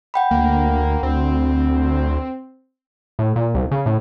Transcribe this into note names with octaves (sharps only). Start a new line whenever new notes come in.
F#5 G5 B5
D2 A#3
D2 C4
A2
A#2
C2
C#3
A2